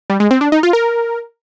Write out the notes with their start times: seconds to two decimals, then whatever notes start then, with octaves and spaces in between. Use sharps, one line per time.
0.10 G3
0.20 G#3
0.31 C4
0.41 D4
0.52 D#4
0.63 F4
0.73 A#4